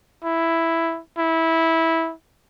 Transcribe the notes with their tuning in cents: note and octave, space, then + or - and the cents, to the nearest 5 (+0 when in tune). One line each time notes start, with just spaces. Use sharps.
E4 +5
E4 -15